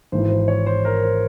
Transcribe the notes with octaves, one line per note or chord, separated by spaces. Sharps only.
G#1 G#2 E3 C5
C5
C#5
C5
A#4
C5